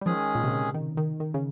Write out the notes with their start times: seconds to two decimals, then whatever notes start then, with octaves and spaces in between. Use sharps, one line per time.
0.01 G3
0.06 D#3 F3 G#3 C#4 G#4
0.35 A#2
0.44 C3
0.51 C#3
0.74 D#3
0.97 D#3
1.20 D#3
1.34 C#3